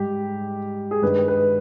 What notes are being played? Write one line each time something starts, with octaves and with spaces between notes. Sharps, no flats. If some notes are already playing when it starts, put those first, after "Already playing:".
Already playing: G#2 G3 G4
G#4
G2 D#3 G#3 B4
B4